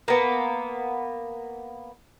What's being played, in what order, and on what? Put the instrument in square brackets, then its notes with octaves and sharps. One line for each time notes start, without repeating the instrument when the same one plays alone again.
[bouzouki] A#3 B3